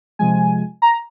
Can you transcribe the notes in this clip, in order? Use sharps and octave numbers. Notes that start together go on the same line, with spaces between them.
C3 F3 G#3 G#5
A#5